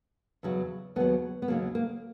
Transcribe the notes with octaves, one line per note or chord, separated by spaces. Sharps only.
E2 C#3 F#3
D#2 C#3 F#3 B3
B3
D#2 C#3 F#3 A#3
A#3